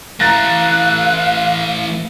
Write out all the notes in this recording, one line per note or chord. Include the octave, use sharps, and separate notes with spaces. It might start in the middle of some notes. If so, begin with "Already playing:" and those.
E3 A3 F5 A#5 F#6 A6 A#6